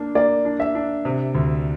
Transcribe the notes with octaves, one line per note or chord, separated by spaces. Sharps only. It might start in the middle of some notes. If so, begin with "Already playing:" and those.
Already playing: A#3 D4
A#3 D5
D4
E5
D4
C3
D2